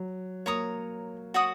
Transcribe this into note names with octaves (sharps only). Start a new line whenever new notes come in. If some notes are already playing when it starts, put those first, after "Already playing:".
Already playing: F#3
A#3 C#5 A#5 D#6
F#4 C#5 F#5 D#6